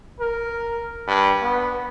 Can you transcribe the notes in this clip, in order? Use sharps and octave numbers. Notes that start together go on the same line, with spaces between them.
A#4
G2
B3